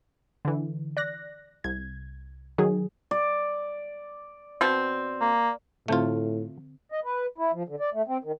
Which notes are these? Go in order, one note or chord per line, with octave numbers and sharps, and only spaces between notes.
D3 E3
D5 F#6 A#6
C2 G#6
D#3 F#3 G#4
D5
B2 C4
A#3
A2 D3 A3 C4 F4 C5
D#5
B4
E4
F3
D3
D5
A3
C4
D#3